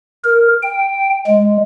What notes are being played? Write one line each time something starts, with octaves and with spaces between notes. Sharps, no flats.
A#4
G5
G#3